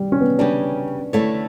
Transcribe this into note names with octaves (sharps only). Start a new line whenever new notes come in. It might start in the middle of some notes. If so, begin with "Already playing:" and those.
Already playing: G3
C#4
B3
C#3 G3 C#4 D4 G4
D3 A3 E4 A4 C#5